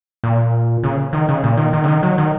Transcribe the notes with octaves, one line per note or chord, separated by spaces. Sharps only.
A#2
C#3
D#3
C#3
A#2
D#3
D#3
C#3
D#3
F#3
D#3